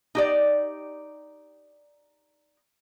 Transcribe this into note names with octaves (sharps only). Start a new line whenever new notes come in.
D#4 G4 D5